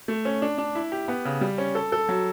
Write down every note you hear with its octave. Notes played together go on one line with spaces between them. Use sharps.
A3
C#4
D4
D4
E4
G4
B3
C#3
G3
C#4
A4
A4
F#3